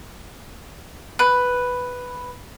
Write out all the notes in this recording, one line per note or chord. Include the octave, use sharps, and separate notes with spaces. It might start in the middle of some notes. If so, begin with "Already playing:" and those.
B4